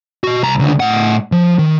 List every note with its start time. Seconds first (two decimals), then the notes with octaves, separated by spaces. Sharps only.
0.24 F#4 D#5
0.43 C2 A#5
0.59 C#2 D3
0.80 A2 F#5
1.32 F3
1.59 D#3